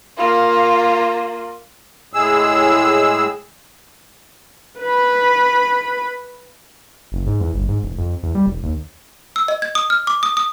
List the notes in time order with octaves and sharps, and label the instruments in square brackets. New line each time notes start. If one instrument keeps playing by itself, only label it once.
[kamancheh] A#3 F4
[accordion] A2 G#3 G#4 E6
[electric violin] B4 B5
[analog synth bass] F#1
G#2
E2
G1
G#2
E1
F2
E2
G3
E1
D#2
[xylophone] E6
D#5
G#6
D#6
F6
D6
D#6
D#6